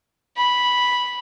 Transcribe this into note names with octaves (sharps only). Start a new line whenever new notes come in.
B5